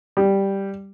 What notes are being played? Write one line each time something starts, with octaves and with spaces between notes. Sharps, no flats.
G3